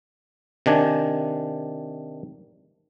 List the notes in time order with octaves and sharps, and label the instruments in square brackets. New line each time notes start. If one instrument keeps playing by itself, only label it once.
[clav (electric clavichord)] C3 D#3 D4 G#5